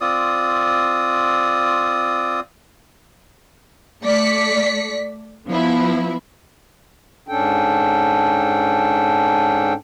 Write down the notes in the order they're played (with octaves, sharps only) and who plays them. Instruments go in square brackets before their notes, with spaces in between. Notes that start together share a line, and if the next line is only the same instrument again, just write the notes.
[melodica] C4 F4 D5 D#6
[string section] A3 D5 B6 C#7
F3 B3 E4
[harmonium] G#2 C#4 D4 A4 G5